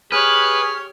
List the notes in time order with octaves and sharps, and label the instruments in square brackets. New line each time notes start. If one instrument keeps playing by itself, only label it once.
[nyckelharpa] G4 C#5 [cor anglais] G#4 [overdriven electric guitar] B4 [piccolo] F6